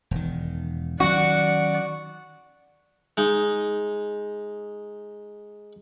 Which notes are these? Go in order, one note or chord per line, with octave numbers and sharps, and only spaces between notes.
E1 D#3
D#3 F#3 C#4 F#4 D5 F#5
G#3 D#4